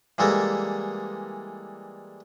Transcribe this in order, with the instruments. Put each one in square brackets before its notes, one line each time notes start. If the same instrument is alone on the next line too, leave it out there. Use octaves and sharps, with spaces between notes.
[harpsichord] E3 G3 G#3 A#3 A4 A#4